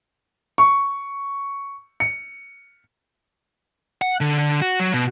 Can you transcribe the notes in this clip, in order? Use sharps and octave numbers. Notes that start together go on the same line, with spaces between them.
C#6
C#7
F#5
D3
F#4
F#3
B2